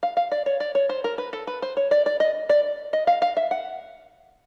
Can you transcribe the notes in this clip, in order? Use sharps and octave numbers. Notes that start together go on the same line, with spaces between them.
F5
F5
D5
C#5
D5
C#5
C5
A#4
B4
A4
B4
C5
C#5
D5
D5
D#5
D5
D#5
F5
F5
E5
F#5